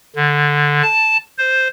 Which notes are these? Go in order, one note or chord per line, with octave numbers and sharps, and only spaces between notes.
D3
A5
C5